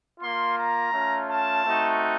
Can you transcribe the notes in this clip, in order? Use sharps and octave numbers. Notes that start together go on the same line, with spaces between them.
A#3 F4 C6
A#5
A3 C#4 F4
A5
A3 C4 D#4 F#4